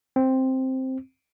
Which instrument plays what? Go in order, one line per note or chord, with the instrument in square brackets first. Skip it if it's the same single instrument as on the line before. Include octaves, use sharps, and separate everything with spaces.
[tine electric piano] C4